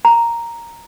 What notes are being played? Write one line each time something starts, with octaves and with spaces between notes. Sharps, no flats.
A#5